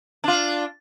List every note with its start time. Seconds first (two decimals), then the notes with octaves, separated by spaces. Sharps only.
0.24 D4 F4